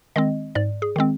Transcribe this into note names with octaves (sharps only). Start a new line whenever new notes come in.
D#3 G#3 C4 D#5
G#2 D5
G#4
D#3 G#3 C4